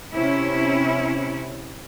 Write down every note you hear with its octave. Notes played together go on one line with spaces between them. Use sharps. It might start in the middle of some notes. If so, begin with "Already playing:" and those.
C3 C#4 E4